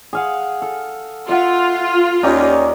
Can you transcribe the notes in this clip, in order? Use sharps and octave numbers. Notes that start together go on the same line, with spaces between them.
G#4 F5 F#5
A4
F4 E5 F#5
D#2 C#4 D#4 G4 D5